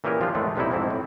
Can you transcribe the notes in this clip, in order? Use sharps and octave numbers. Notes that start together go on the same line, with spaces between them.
A#2 E3 C#4 G4 G#4 A#4
F3 G3 D4 E4 F4
E2 A2 G#3 A3 F#5
B1 C3 G3 D#4 E4
F2 G#2 C4 E4
A2